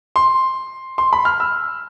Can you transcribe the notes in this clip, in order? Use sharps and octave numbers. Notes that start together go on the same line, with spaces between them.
C6
C6
B5
F6
E6